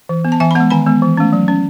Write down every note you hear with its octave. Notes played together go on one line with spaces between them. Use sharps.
E3
B3
A5
E3 E5 G#5
B5
G#3 B3 F#5 A5
D#3 G#5 B5
G#3 B3
E3
A3 C#4
F#3
C#4